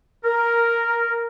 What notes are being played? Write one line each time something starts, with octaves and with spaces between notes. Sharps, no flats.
A#4